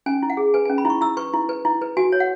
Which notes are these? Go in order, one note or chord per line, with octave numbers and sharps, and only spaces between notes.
C#4 G#5
E4
F#5
G#4
B4 G#5
G#5
C#4
B5
E4 C#6
E4 E6
B4 C#6
E4
B4
E4
B4
F#4 G#5
C#5
F#5